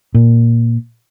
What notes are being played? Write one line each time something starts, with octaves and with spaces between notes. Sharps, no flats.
A#2